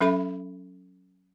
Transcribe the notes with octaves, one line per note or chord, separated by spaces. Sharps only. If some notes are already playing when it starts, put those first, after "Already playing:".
F#3 C#4 A4 E5 B5